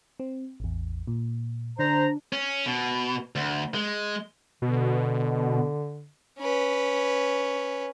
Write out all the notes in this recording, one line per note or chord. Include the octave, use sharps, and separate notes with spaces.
C4
A1 E2
A#2
D3 D4 C5 A#5
C#4
B2
D2
G#3
B2 D3
C#4 B4